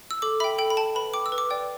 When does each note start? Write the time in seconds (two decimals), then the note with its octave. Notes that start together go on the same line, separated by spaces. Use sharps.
0.11 E6
0.22 A4 D6
0.40 E5 G5 B5
0.58 A4 G5
0.70 B5
0.77 G5 A5
0.95 B4 B5
1.14 G5 D6
1.26 E6
1.32 B4
1.38 D6
1.50 D5 G5